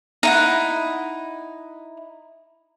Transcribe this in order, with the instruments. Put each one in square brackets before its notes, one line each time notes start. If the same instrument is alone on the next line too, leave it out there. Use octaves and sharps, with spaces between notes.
[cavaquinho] D#4 E4 F#5